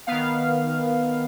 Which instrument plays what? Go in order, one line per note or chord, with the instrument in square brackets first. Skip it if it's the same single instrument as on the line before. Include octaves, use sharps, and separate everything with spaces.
[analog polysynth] D#3 B3 F5